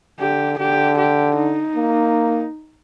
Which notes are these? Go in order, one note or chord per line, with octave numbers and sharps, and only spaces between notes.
D3 G4
D3 G4
G4
D#4
A#3